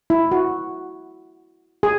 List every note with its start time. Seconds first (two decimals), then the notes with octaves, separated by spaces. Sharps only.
0.10 E4
0.31 F#4
1.83 G#4